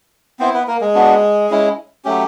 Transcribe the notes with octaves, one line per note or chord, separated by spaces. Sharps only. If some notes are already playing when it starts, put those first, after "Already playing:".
B3 C4 E4 C5
B3 B4
A#3 A#4
G#3 G#4
B3 D4 F#4
G#3 C#4 E4
F#3 A3 C#4 G4